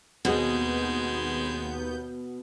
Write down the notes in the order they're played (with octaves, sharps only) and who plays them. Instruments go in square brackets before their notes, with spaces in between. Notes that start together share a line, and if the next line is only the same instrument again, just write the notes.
[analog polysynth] D#2 B3 G6 [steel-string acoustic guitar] B2 [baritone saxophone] G#3 [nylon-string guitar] C4 F#4 G#4